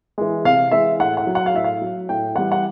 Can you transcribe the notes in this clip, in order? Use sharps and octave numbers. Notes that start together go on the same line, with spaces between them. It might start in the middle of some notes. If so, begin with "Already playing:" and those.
E3 G#3
C3 F5
E3 G#3 E5
A2 F#5
F#5
F#3
F#5
F5
A2 E5
F5
F#3
A2 G5
E3 G3 F#5
F#5